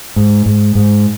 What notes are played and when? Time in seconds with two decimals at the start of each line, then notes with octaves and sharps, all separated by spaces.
0.16 G#2
0.46 G#2
0.75 G#2